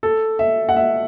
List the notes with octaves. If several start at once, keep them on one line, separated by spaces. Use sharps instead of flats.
A4
E5
F#5
E5